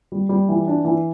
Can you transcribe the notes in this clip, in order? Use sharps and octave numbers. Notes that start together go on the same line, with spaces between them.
G3
G3
E3
D4
E3